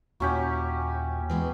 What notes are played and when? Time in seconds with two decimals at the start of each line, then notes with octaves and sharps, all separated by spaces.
0.20 D#2 A#2 F#3 C#4 E4 G4
1.30 E3 G#3 B3